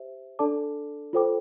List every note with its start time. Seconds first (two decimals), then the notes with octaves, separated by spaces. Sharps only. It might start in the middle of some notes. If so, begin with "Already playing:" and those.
Already playing: G4 C5 E5
0.39 D4 A4 D5 A5 D6
1.13 F4 A4 C5 G5 D6